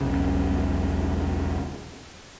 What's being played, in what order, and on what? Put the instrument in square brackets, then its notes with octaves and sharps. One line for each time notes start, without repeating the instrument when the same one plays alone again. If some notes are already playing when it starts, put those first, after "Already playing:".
[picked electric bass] E1 B1 C#3